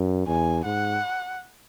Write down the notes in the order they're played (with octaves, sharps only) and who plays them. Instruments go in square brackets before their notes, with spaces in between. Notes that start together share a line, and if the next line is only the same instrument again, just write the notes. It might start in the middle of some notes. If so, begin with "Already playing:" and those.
Already playing: [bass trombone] F#2
[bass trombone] E2 [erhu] G#5
[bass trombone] G#2 [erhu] F#5